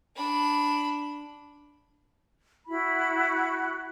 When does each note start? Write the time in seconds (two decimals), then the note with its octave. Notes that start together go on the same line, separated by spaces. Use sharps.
0.16 D4 B5
2.67 E4 F#4 B5